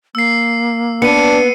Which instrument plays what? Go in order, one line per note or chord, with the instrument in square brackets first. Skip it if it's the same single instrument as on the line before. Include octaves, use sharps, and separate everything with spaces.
[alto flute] A#3 [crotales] E6 C7
[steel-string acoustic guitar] B3 [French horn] D4 [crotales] C#7 D#7